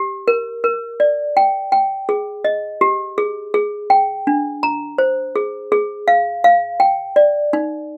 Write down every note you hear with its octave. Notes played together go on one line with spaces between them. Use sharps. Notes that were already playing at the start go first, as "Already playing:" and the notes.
Already playing: G4
A#4
A#4
D5
G5
G5
G#4
D#5
G4
G#4
G#4
G5
D4
A#5
C5
G#4
G#4
F5
F5
G5
D5
D#4